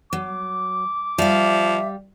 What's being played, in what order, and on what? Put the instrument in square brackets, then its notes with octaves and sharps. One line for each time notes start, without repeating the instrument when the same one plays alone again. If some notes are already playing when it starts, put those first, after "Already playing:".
[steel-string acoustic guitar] F#3 [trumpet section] D6
[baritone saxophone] F3 [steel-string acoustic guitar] G3 F5 [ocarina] E5